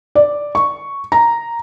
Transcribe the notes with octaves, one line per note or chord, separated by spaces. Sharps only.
D5
C#6
A#5